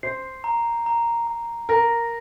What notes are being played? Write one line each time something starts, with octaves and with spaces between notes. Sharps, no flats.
C5 C7
A#5
A#5
A#5
A#4 A#6